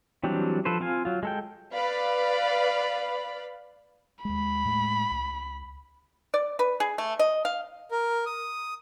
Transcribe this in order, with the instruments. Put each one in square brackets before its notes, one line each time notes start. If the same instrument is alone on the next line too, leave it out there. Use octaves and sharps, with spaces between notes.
[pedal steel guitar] E3 F#3 G3 C4 D4
F3 A4 B4 C5
C4 F4 F5 G#5
F#3 F4
G#3 A4 G5
[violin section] B4 D5 F5 B5
[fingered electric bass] D#2 G#3 [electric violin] B5
[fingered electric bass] A2 G#3 A3
C#2
[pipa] D5
B4
G#4
A3
D#5
F5
[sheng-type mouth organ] A#4
D#6